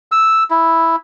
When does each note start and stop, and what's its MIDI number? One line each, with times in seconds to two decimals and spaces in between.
0.12 0.43 88
0.51 0.96 64